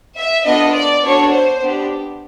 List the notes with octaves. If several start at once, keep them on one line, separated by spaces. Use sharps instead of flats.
E5
B3 D4 F4 A4 D#5
D5
B3 D4 F#4 A4 C#5
C5
B3 D4 G4